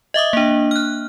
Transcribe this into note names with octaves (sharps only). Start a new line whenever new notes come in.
D#5 E5 D6 D#6
A#3 D4
F6 F#6